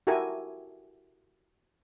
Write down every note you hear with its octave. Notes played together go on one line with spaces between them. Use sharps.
E4 F#4 G4 A4 A#4 G#5